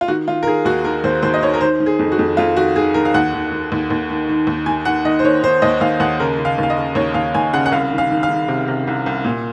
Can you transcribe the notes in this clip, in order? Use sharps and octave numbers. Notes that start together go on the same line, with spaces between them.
F4
D#3 F#4
D#3 F4
A#4
D#3 G#4
D#2 F#4
D#3 A#4
D#2 C5
D#2 C5
D#5
D#3 C#5
A#4
D#3 C5
D#3
G#4
F2
F#4
F2
F2 F4
D#3 F#4
D#3 G#4
D#3 A#4
F5
D#2 F#5
D#3
D#3
D#2
D#2
D#3
D#3
D#2
D#3 G#5
D#3 F#5
D#3 D#5
C5
D#3 C#5
D#3 C5
D#2 D#5
D#2 F5
D#2 F#5
C#3 A#4
C#3
F5
D#2 F5
D#5
C#3
D#2 C#5
D#2 F5
D#2 G#5
C#3 F#5
F#5
C2 F5
D#3
F5
D#3
F5
D#3
C3
C3
C2
C2
A#2